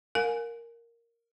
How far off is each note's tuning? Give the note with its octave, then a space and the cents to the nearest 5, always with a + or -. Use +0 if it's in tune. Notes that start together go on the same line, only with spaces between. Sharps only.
A#4 -5 F5 +40 G#5 +0